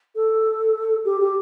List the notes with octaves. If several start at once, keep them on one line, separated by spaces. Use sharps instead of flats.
A4
G4
G4